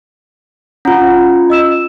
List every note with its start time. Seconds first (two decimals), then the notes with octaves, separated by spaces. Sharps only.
0.85 C#4 F4 F#5 A#5
1.50 D#5 E6 E7